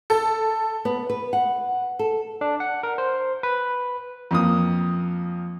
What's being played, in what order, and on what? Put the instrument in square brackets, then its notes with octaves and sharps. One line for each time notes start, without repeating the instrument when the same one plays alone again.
[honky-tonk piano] A4
[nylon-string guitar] B3
B4
F#5
A4
[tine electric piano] D4
F#5
A#4
C5
B4
[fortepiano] F2 A#3 D#6